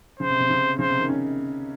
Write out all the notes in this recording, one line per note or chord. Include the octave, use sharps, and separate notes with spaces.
C#3 C5
C3
C3
C#3
C#3 C5
C3
D#3
C#4